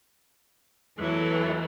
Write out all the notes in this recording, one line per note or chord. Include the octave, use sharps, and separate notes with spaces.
E2 E3 F#3 A3